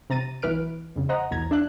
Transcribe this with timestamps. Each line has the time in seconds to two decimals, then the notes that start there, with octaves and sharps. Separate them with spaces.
0.10 C3 A#5 A6 D#7
0.42 B1 E3 B4 F6 D7
0.96 F2 C#3
1.09 C5 D#5 F#5 A#5
1.31 B1 E2 A#5 G#6
1.51 D4 E5 F#6